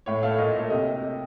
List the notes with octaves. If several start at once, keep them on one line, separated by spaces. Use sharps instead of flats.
A2 C#5
A3 F5
A#2 D#5
A3
C3 D#5